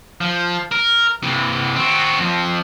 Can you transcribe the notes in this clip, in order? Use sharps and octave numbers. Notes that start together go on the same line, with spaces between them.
F3
A#4
C3 E3
C4 F#4
F2 F3